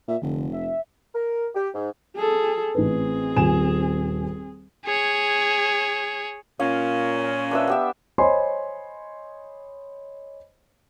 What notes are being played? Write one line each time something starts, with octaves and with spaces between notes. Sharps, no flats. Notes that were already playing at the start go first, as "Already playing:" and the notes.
A#2 E5
F1 D3
E5
A#4
G4
G#2
G#4 A4
A1 C4 G#4 B4
D#1 G#5 E7
G#4 C#5
A#2 C#4 F5
D4 B4 E5
B3 G4 E5
C5 C#5 D#5 G#5 B5 C6